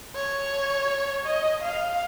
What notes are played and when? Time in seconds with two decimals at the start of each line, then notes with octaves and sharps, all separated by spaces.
0.16 C#5
1.26 D#5
1.63 F5